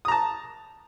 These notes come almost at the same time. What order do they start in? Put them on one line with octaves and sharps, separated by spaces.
D#6 A#5 A5